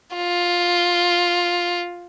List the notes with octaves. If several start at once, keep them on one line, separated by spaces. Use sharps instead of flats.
F4